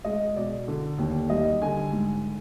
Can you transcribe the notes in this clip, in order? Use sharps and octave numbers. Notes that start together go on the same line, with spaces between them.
G#3 D#5
B2 D5
D3
D#2
G3 D#5
D3 G#5
G#2